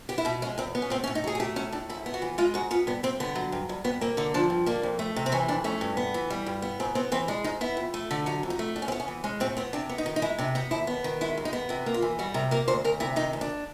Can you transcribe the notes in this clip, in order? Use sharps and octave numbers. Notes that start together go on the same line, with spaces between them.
B3 G4
E4
B2 D#4
G#3 C#4
E2 C4
B3
C#4
A2 C4
C#4
A2
D#4
F#3 G#4
G#4
A3 G4
A2 C#4
A2 D4
G#2 E4
B3
F#4
E3
G#3 F4
G#2 F#4
B3 F4
G2 B3
G2 C4
D3 B3
F#3
G2
G2
G2 B3
A#3 C4
D3 D#4
F3 D4
G2
A#3 D4
F2
A3
C3
C4
E3 C#4
F2 D4
A3 C#4
G2
B3
E3
G3
G2
B3
G#2 C4
B3 C4
E3 C4
G#3 D4
G#2 D#4
B3 E4
F2
A3
D3
F#3 D#4
F2
D#4
A3
A2 D4
C#4
C4
B3
C#4
E3
G#3 C#4
A2 C4
B3 C4
C3 D4
B3
D#4
D#3
D#4
G#3 E4
C3 D4
B3 D#4
D#2 E4
B3
D#3
G#3 E4
D#2
D#4
B3
C3 E4
A#3
F4
E3
G3 F#4
C3 A#4
A#3 A#4
D2 C5
D2 A#4
C3 E4
D#3 D#4
D2
D4